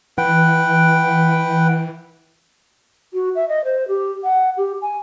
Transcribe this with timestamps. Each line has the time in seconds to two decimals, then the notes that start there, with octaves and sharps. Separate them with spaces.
0.18 E3 B4 F#5 G5
3.14 F#4
3.35 E5
3.49 D#5
3.65 C5
3.88 G4
4.24 F#5
4.57 G4
4.82 G#5